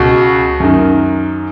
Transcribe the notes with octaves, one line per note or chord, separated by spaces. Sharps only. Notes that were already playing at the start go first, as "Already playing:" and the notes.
Already playing: C#2 B2 F#4
F#2 D#3